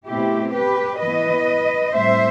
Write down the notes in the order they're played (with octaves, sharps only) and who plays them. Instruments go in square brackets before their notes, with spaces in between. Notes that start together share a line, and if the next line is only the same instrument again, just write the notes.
[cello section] B2 A3 C4 E4 G4
G4 B4
E3 B3 B4 D#5
A2 G3 C4 C5 E5